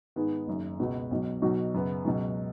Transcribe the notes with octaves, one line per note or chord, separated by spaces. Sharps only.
G#2 D#3 B3 G#4
F#1 F#2 D#3
C#2 B2 B3 F#4
B1 B2 F#3
B1 B2 F#3 D#4 F#4
F#2 C#3 B3
C#2 B2 F#3